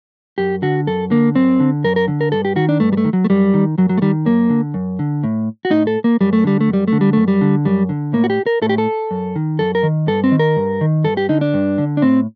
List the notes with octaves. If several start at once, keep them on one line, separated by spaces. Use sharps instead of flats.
F#2 G4
D3 F#4
F#2 A4
D3 A#3
F#2 C4
D3
F#2 A#4
A#4
D3
A#4
G2 A4
G4
D#3 F#4
D4
G2 A3
G3
A3
D#3
F#3
A3
F#2 G3
D#3
F#2 F#3
F#3
A3
D#3 G3
F#2 A#3
D3
F#2
D3
A2
F#4
A2 D#4
A4
A#3
F#2 G3
A3
D3 G3
A3
F#2
G3
D3 A3
G3
F#2 A3
G3
D3
F#2 G3
D3
A2 A#3
F#4
G4
A#4
A2 A4
G4
A4
F#2
D#3
F#2 A4
A#4
D#3
G2 A4
C4
D#3
A#4
G2
D#3
G2 A4
G4
D3 D#4
D4
G2
D3
D4
A2 C4